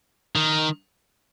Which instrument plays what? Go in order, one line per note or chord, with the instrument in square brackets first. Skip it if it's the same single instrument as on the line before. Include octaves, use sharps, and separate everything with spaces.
[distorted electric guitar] D#3